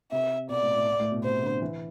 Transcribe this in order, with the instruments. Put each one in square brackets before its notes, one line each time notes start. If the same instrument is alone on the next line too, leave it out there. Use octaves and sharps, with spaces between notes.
[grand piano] C3 [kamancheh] E5
[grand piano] B2 [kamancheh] D5
[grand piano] A2
A2
A2
B2
[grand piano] C3 [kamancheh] C5
[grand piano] D3
E3